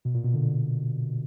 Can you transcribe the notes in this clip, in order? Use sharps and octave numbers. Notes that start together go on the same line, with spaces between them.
B2
A#2
B2
A#2 D3
A#2 D3